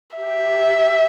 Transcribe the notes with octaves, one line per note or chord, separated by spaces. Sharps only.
G4 E5